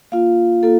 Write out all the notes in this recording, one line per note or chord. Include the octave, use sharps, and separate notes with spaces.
A#3 F4 F5
A#3 F4 A4